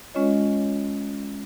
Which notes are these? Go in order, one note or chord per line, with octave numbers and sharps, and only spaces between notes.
G#3 C#4 F4 C#5 D#5